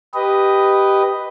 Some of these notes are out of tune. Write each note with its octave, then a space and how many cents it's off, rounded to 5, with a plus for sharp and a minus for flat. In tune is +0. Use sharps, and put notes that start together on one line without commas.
G4 +0 B4 +0 D#5 +0